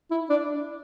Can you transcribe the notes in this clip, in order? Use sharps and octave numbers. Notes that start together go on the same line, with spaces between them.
E4
D4